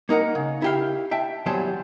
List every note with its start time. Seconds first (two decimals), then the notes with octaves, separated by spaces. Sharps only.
0.09 A#3 D#4 A#4 F#5
0.35 C#3
0.62 E4 G4 F5
1.11 E5 G5 A5
1.46 E2 E3 F#3 G3 C5 A5